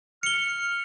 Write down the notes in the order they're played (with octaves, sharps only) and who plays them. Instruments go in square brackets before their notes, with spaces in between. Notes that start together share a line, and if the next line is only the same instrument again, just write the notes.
[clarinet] F6 [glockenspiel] C#7 G7